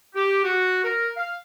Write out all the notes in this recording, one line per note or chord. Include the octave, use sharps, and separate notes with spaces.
G4
F#4
A#4
F5